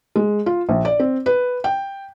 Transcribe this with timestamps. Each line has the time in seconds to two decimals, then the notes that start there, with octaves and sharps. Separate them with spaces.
0.16 G#3
0.46 F4
0.69 A#1
0.85 D5
1.00 C4
1.26 B4
1.64 G5